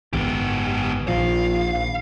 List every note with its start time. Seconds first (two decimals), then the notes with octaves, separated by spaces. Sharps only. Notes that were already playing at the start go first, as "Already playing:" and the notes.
0.13 G#1 F#2 D#3 B3 G4
1.08 A#1 A#2 D#3 F3 F5